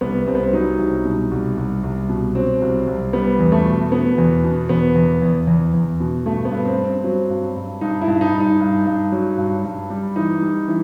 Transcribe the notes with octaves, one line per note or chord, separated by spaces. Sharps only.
C2 B3
C2 C4
B3
C4
F#3 D#4
C2
B2
C2
C2
C2
B2
F#3 C4
C2
C2
G3 B3
E2
A3
B2
B2 B3
E2
B2
E2 B3
E2
E2
E2
E2
B2
G2 A3
B3
G2
C4
G2
C4
F#3
G2
G2
G2 D#4
E4
G2
D#4
G2
D#4
G2
G2
F#3
G2
G2
G3
E3 D#4
G3
E3